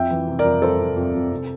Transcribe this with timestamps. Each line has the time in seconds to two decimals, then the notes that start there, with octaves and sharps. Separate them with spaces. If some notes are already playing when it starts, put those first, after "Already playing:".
Already playing: F2 E5 G5
0.11 E3
0.28 C3
0.39 A#4 D5
0.44 F2
0.62 F2 A4 C5
0.79 C3
0.96 F2
1.14 F2
1.31 C3